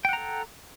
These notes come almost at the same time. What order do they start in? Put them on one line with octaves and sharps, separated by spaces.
G5 F#5 A#5 A4